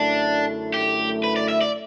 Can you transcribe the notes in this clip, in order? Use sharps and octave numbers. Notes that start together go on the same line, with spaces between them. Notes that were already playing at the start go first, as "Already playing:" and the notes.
Already playing: F#2 D3 A3 D4 E4
G4
B4
D5
E5
D5